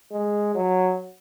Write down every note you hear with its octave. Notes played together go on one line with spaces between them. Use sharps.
G#3
F#3